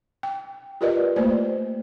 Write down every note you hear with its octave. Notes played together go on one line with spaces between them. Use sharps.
G5
F4 G4 A#4 B4 D5 D#5
A3 A#3 C5 D5